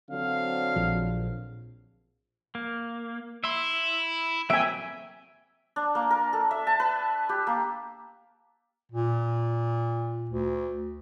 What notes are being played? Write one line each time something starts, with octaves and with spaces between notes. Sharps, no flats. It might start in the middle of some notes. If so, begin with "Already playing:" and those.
D3 F#3 C4 F5
A#1 F3
A#3
E4 E5 C6
F#3 A#3 C4 E5 G5 G#5
D4
A#3
A#4
A4
E5
A5
B4
G4
A#3
A#2
D2